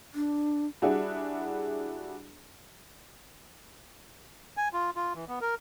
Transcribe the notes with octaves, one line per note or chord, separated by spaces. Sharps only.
D4
G3 D4 E4 F#4 G#4
G#5
F4
F4
E3
B3
A#4